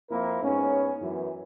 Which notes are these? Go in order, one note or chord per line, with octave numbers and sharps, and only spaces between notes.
F2 A#3 C4 E4 A#4
G#2 B3 C#4
F#2 E3